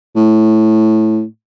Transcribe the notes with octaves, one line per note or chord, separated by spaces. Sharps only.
A2